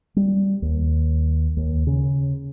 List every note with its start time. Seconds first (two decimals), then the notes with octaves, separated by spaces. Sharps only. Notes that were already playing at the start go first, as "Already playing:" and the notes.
0.16 G3
0.62 D#2
1.57 D#2
1.87 C#3